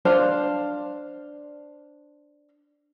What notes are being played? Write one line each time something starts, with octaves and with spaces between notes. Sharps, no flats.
D4 C5 F5